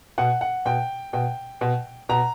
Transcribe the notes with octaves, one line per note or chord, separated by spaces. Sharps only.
B2 F#5
F#5
B2 G5
B2 G5
B2
B2 A#5